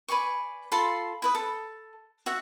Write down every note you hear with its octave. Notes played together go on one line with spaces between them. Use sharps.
B4 D5 G#5 C#6
F4 A4 B5 C6
E4 B4 D#6
A4
F#4 E5 F#5